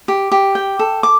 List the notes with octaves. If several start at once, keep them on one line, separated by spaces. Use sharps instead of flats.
G4
G4
G5
A4
D6